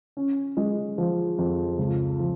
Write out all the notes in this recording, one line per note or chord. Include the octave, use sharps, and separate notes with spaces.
C#4
G#3
F3
F2
C#2
F3